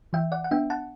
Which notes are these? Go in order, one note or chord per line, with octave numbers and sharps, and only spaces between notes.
E3 E5 G5
D5 F#5
F#5
B3 D4 E5 G5
F#5 A5